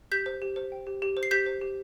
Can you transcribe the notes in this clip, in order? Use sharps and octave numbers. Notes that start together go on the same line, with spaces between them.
G4 G6 B6
C5
G4
C5
G5
G4
G4
C5
C7
G4 G6 B6
C5
G4